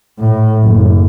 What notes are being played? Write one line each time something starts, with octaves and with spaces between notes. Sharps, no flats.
A2
F#1